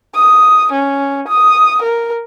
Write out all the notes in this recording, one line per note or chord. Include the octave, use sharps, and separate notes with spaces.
D#6
C#4
D#6
A#4